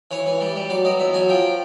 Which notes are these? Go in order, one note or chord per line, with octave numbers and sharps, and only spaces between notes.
E3 C#5
E3
G3
G3
F#3 D5
F#3 D#5
E2 E5
F#3 G#5
F3 G5